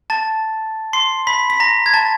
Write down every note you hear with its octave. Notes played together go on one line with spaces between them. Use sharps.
A5 A6
C6 C7
B5 B6
B6
A#5 A#6
G#6
A5 A6